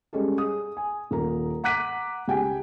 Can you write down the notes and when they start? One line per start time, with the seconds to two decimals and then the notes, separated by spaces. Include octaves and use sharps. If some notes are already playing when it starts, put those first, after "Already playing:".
0.13 G3 G#3 C#4 A4
0.38 G#4 D#6
0.77 G#5
1.11 D#1 A#3 A#5
1.64 F#5 A#5 D6 F#6 B6 D#7
2.28 C#2 G4 G5 G#5